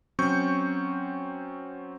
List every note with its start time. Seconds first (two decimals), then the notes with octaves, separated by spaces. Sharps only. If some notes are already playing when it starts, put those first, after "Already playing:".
0.19 F#3 C4 C#4 C#6 G6